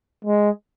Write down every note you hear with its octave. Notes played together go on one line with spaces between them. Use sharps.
G#3